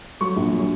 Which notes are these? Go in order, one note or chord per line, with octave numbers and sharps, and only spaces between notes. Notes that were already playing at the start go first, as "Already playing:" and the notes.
F#3 C#6
A#1
F#3